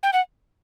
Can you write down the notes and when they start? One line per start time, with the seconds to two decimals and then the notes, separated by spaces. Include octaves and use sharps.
0.03 G5
0.13 F#5